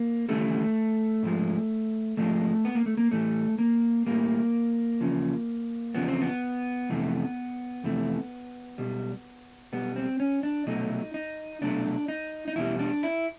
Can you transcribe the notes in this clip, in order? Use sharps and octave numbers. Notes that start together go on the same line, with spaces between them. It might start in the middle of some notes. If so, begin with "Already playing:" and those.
Already playing: A#3
D#2 C#3 E3 G3 A3
G#2 F3 G#3
G#2 F3 G#3 A3
B3
A#3
A3
A#3
A2 E3 G3 A3
A#3
A2 E3 G3 A#3
E2 C#3 F3
E2 C#3 F3 B3
C4
B3
F2 C3 E3 A3
F2 C3 E3 A3
B1 B2 G3
B1 B2 G3 B3
C4
C#4
D4
C2 B2 F#3 A3 D#4
D#4
C2 B2 F#3 A3 D4
D#4
D#4
E2 B2 G3 E4
D4
E4